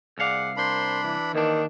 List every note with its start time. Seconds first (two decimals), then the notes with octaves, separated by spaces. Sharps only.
0.18 C2 G#4 D5 F5 F#5
0.57 D4 A#4 C5 B5 C6
1.02 E3
1.35 D#2 D#3 D4